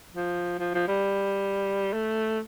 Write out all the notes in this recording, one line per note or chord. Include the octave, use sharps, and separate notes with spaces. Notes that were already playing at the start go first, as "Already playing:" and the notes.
F3
F3
F3
G3
A3